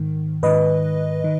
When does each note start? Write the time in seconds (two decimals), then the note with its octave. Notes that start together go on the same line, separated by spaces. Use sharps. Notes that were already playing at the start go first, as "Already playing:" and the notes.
Already playing: G#2 D#3
0.43 G#2 D#3 B4 D#5
1.24 D#3